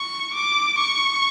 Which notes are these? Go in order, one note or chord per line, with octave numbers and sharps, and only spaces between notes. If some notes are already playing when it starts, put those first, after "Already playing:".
Already playing: C#6
D6
C#6